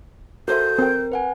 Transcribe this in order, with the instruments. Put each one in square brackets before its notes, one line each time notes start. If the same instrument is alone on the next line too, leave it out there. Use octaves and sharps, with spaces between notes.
[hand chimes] F#4 A4 [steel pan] A#4 C5 E5 [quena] G6
[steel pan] C4 G5 [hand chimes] A#4
[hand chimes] B4 F#5 G#5